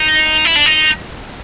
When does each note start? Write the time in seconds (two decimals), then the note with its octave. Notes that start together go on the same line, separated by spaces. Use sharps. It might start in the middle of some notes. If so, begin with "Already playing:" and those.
Already playing: D#4
0.45 E4
0.56 D4
0.66 D#4